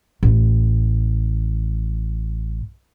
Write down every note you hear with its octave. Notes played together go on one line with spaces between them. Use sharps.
A1 A2